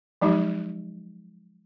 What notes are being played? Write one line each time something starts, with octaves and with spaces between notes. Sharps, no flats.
F3 F#3 G#3 D#4 G4